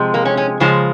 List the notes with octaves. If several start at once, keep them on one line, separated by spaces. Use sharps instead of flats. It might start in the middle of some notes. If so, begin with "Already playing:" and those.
Already playing: C3 F3 G#3
A#3
C#4
C#4
C#3 F3 G#3